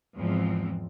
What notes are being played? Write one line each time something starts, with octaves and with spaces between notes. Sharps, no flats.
E2 G#2 E3 F3 C4